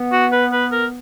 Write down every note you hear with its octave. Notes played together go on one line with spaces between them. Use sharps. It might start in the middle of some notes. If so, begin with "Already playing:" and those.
Already playing: B3
F#4
B4
B4
A#4